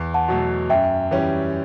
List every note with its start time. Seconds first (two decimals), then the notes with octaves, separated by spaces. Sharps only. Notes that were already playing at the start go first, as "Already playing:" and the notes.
Already playing: E2
0.14 F#5 A5
0.28 B2 F#3 A3
0.70 F#2 E5 G5
1.11 E3 G3 C#4 G4